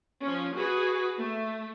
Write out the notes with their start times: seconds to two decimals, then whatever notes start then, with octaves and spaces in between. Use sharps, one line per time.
0.23 F3 C#4
0.54 F#4 G#4 B4
1.19 A3